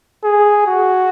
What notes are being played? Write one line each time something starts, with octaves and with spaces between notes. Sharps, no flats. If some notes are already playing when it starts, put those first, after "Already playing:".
G#4
F#4